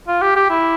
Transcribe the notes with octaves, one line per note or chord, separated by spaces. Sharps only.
F4
G4
G4
E4